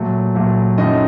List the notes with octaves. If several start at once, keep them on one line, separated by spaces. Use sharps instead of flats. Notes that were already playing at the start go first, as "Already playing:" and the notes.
Already playing: A#2 F#3 A3
A#2 F#3 A3
F#2 D#3 F#3 A3 D#5